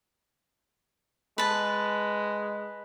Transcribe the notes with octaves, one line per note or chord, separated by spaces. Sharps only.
G#3 B4 A5